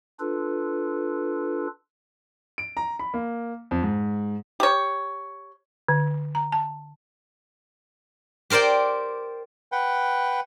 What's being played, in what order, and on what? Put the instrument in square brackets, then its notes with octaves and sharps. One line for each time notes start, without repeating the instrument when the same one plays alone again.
[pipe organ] D4 F4 A4 B4
[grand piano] D7
A#5
B5
A#3
F2
G#2
[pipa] G4 C#5
[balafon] D3
A#5
A5
[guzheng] G4 A#4 C5 D5 G5
[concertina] B4 F#5 G5